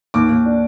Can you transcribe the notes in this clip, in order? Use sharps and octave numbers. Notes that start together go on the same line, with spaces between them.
D#2 D6
D#2
D4